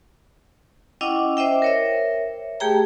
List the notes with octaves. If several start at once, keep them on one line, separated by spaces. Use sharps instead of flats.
C#4 E4 D#5 F#5 G5 D6
C5 D#5 E5 G5
A#4 C#5 E5
A3 G4 G#4 G5 A#5